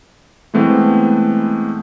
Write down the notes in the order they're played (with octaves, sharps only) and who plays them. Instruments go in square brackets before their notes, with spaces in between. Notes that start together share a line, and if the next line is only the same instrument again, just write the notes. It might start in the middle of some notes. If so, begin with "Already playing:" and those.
[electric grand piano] E3 G#3 A3 B3 C4